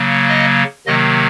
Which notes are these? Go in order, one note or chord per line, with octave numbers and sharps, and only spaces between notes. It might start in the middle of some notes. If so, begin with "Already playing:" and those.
Already playing: C#3 F#3 A#3
D#5
C3 D#3 F#3 A#3 D#5